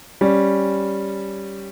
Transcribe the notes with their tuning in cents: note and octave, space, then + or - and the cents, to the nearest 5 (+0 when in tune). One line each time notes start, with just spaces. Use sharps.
G3 +0 C#4 +0